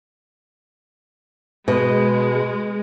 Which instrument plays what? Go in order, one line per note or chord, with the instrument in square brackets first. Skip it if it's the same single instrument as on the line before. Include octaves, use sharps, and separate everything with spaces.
[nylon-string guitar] B2 [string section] G#3